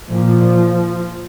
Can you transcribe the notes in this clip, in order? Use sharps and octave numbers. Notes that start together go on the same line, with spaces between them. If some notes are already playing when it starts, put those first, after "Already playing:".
A#2 F3